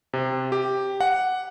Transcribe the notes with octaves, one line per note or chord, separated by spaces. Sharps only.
C3
G4
F#5